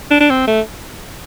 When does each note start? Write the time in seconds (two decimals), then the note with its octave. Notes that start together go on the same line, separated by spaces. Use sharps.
0.11 D4
0.21 D4
0.30 C4
0.47 A3